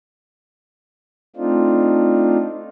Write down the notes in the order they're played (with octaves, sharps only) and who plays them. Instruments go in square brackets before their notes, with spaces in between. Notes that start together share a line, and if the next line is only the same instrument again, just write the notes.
[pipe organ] A3 C4 D4 D#4 F4